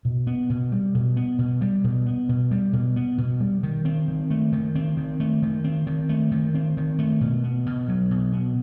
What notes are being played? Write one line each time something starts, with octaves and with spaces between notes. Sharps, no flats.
B2
B3
B2
G3
B2
B3
B2
G3
B2
B3
B2
G3
B2
B3
B2
G3
D#3
C4
D#3
A3
D#3
C4
D#3
A3
D#3
C4
D#3
A3
D#3
C4
D#3
A3
B2
B3
B2
F#3
B2
B3